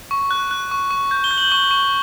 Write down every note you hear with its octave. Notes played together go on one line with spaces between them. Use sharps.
C#6
F#6
F#6
C#6
C#6
G6
G7
G6
F#7
C#6 G7
C#6